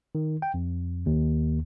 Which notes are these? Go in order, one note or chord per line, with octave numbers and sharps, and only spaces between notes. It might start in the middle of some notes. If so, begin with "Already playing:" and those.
D#3
G5
F2
D#2